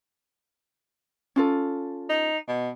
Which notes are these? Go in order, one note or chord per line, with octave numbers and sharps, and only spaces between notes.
C#4 F4 A4
D#4
B2